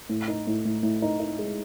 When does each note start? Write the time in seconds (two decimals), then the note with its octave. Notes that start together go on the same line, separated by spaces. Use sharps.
0.09 A2
0.28 D#4
0.47 A2
0.65 A2
0.83 A2
1.02 D#4
1.20 D#4
1.39 G#3